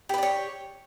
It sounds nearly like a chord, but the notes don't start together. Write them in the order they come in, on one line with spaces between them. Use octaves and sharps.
G4 B4 D5 C#5